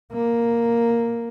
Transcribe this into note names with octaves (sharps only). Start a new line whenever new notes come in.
A#3